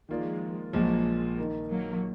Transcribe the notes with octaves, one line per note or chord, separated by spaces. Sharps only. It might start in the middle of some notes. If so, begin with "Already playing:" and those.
D#3 F3 G#3 A#3 F4 A#4 D5
A#1 A#2 F3 F#3 G#3 A#3
D#3 A#3 D#4 A#4
F#3 A#3